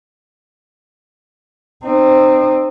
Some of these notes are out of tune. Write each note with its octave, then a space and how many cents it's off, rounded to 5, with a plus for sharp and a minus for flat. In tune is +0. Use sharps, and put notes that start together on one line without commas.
C4 +0 D#4 -30